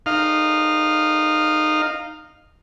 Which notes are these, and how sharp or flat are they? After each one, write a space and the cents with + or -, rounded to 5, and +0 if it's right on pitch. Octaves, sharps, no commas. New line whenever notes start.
D#4 -20 F5 +0